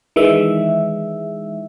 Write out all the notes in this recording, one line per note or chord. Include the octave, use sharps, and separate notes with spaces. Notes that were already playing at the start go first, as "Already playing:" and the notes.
D#3 E3 G#3 E5